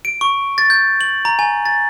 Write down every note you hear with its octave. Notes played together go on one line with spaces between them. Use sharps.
D7
C#6
A6
G6
F#7
A#5
G#5
A6